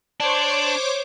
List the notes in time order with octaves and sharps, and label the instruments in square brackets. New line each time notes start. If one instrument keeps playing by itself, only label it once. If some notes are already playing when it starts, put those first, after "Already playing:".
[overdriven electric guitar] D4 [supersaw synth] C5 C#5 D6